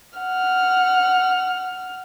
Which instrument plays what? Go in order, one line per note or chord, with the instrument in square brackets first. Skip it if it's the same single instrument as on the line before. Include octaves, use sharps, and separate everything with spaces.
[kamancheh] F#5 F6